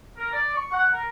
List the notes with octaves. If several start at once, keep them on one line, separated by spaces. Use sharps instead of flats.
A#4
D5
C#6
F#5
A#4